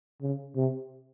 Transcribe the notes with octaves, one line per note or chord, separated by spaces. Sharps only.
C#3
C3